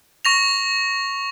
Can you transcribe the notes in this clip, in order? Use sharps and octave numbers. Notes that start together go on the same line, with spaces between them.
C#6 A#6 F7